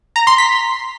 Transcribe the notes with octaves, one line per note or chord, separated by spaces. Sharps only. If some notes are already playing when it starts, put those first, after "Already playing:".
A#5
C6
B6